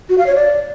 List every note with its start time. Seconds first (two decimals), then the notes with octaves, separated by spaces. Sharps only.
0.10 F#4
0.18 F5
0.27 C#5
0.35 D5